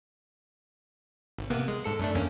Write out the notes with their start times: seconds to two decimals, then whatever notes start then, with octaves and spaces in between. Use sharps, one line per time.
1.39 G#1
1.50 C3 A#3 B3
1.68 G#3
1.84 G#2 A4 C#7
2.00 F#2 A3 D4
2.15 E2 A#3 C#4